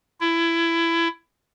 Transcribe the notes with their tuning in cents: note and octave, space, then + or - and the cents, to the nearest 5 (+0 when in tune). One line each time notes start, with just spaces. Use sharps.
E4 +20